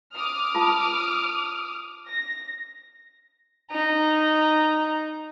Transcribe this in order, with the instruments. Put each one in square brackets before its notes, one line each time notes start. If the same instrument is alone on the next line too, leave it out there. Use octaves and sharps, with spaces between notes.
[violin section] D6 D#6 F6
[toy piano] F4 A5
[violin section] A#6
[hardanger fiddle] D#4 A#5